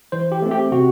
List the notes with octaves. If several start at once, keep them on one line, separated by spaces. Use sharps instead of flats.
E3 C5
G4
A3 C4
G4
C3 F#4